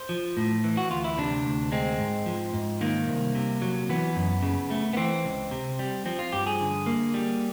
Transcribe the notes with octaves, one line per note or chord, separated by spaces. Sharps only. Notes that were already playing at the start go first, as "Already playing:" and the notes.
Already playing: C5
F3
A2
E3
F#4
D2 F4
E4
C3 D4
D2
G#3 C4
G#2
F3
G#2
D#3 A#3
C2
C3
F#3
E3 B3
F#2
C#3
A3
B3
E3 C4
C#2
C3
G3
F3 C4
F4
G2 G4
G#4
D3
A#3
G3